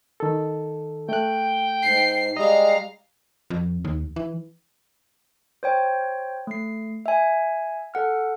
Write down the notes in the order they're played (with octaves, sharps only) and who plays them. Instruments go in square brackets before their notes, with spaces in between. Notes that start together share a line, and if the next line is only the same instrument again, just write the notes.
[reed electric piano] D#3 A4
[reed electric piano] A3 F#6 [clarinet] G5
[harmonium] G#2 [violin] C7
[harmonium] G3 G#3 [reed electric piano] D#5 [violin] F5 A#5
[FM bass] F2
D#2
E3
[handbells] C5 C#5 G5
A3 C7
E5 G#5
A4 F#5 F6